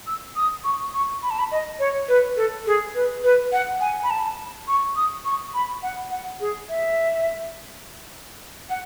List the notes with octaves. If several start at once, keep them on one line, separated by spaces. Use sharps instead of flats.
E6
D#6
C#6
C#6
B5
A5
B5
D#5
C#5
B4
A4
G#4
B4
B4
F#5
G#5
B5
A5
C#6
D#6
C#6
B5
F#5
F#5
G#4
E5
F#5